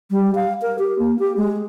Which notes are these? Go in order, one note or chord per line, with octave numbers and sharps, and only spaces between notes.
G3
F5
A#4
G4
A#3
G4
G#3